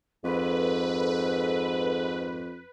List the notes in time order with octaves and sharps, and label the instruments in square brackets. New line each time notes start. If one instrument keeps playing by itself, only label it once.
[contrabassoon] F2 [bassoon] G#2 [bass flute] A4 [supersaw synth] B4